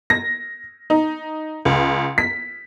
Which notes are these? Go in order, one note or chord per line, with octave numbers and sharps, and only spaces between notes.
A#6
D#4
C#2
B6